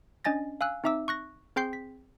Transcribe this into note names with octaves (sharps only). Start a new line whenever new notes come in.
C#4 D4 D#5 G#5 A6 A#6
F5 G#5 E6 F#6
C4 D#4 E5 D6 E6
C#6 F#6 A#6
C4 G#4 G5 C6 G6 C7
B6